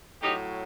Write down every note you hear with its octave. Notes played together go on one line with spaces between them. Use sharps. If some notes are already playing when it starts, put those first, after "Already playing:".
A2 F#3 D#4 G4